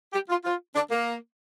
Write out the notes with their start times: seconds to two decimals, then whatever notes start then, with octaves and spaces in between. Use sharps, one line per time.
0.13 G4
0.29 F4
0.44 F4
0.75 D4
0.91 A#3